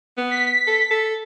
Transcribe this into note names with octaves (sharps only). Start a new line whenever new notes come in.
B3
B6
A4
A4